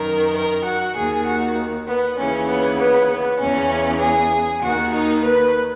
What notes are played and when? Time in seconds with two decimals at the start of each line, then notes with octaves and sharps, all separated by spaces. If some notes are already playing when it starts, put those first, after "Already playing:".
Already playing: F#2 D#3 A#4
0.36 A#4
0.65 F#4
0.96 D#2 D#3 G#4
1.27 F#4
1.88 B3
2.18 D#2 C#3 E3 C#4
2.48 B3
2.79 B3
3.10 B3
3.41 E2 C#3 E3 C#4
4.01 G#4
4.62 D#2 D#3 F#4
4.93 D#4
5.23 B4